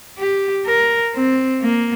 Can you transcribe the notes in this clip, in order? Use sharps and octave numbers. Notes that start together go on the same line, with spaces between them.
G4
A#4
C4
A#3